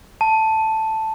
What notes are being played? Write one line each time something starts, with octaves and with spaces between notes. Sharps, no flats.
A5